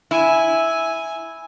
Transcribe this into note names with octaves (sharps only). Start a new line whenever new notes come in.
E4 G#5